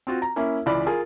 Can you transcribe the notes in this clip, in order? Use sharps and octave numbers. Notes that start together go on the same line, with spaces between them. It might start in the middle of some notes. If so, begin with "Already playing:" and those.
C4 F4 F#4
A#5
A#3 C#4 E4
C#2 E3 D5 B5
F4 G#4 A#4